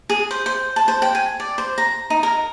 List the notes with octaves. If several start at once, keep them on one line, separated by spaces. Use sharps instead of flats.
G#4
C5
C5
A5
C5
G5
G#5
D5
C5
A#5
D#4
A#4